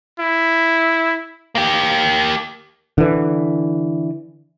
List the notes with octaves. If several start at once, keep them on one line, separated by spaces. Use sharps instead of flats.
E4
A#3 G4
D3 E3